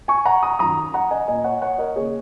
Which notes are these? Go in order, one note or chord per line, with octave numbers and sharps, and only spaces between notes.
G#5 C#6
F#5 A#5
A#5 D#6
F#2 D#3 F#3 A#5 D#6
F#5 A#5
D#5 G#5
A#2 A#3 D#5 G#5
C#5 F#5
C#5 F#5
A#4 D#5
C#3 A#3 G#4 C#5